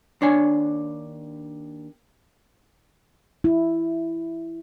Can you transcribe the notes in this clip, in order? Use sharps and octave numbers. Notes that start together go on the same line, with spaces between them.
D#2 D4 C#5 G#5
E4